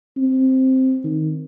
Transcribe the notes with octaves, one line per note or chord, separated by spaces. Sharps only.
C4
D#3